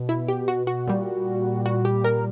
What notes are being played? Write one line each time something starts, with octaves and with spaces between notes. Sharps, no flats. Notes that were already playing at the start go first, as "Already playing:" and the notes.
Already playing: B2
E4
G4
F#4
F#4
A#2 G3
F#4
G4
A#4